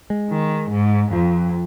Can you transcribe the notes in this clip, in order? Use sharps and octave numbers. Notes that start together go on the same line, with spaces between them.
G#3
D#3
G#2
F2 F3